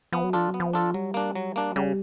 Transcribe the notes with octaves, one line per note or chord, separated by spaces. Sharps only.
F3 B3
F#3
F3 D4 F4 A4
F#3
B3
F3
D4 F4 A4
F#3 G3
A#3 D4
F#3
A#3 D4
F#3
C#3 G3